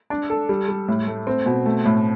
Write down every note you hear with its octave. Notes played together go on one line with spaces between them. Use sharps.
D4
A4
G3
G3
A2
A3
C4
B2
A3
A2